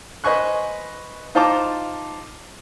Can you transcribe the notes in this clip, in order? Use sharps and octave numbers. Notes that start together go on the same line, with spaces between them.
B4 C5 D#5 G#5 C#6 F#6
D#4 F4 C5 A5 A#5 D6